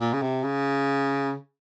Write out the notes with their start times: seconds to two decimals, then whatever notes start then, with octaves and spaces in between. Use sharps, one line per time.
0.01 A#2
0.14 C#3
0.22 C3
0.44 C#3